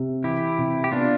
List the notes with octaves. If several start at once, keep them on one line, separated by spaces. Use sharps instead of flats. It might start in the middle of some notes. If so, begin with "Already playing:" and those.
Already playing: C3
E3 E4 G4
C3
G4
B3 D4 F4